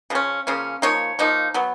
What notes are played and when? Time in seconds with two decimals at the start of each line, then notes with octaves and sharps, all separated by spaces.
0.10 C#3 F3 C#4
0.47 C#3 F3 A#3 C#4
0.82 F3 A#3 D#4 C#5
1.19 F3 A#3 D#4
1.54 F#3 B3